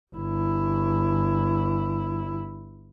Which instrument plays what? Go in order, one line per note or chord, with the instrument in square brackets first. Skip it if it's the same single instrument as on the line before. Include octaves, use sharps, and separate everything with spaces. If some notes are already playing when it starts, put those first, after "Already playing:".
[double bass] G1 E4